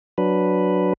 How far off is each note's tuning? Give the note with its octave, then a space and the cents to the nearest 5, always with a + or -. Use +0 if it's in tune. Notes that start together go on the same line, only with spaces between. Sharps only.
F#3 +0 D4 -5 B4 +0